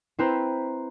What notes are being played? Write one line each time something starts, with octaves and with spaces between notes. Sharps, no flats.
C4 E4 B4 C5 A#5